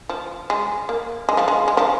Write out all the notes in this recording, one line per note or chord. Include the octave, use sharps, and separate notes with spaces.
F3
G#3
A#3
G#3
F3
G#3
G#3
F3